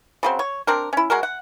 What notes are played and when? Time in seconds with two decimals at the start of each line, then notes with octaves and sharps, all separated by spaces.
0.23 C#3 F#3 C4
0.39 C#5
0.67 C4 D4 A#4
0.93 C#4 E4
1.10 G#3 F#4 A#4
1.23 F#5